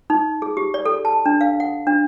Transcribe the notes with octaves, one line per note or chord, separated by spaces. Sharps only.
D#4
G#4
G4
D5
A4
A5
D4
F5
F#5
D4